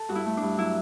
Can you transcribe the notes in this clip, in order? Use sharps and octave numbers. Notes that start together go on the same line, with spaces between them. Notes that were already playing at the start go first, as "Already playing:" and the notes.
Already playing: A4
G2 F#4
E4
A3
D4
G2
F#3 E4